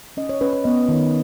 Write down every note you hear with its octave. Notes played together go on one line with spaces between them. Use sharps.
C#4 D#5
C#5
C#4 B4
B4
B3 D#5
D#3